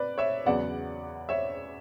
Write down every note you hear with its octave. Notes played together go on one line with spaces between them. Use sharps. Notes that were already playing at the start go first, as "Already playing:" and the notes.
Already playing: B4 D5
C#5 E5
E2 C#3 F#3 B3 D5 F#5
C#5 E5